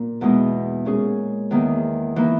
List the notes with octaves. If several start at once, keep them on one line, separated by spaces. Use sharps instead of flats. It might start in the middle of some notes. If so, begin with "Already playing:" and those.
Already playing: A#2 A#3
E2 B2 G#3 D#4
A#2 G#3 C#4 G#4
E2 D#3 A#3
E3 A#3 D#4